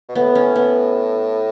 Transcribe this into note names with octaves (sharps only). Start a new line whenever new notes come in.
B2
A2 B3
C#4
B3